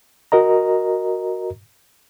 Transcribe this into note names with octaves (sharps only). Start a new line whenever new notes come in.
F#4 A#4 D#5 A#5